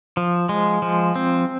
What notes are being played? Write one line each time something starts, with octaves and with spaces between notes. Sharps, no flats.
F3
G#3
F3
C4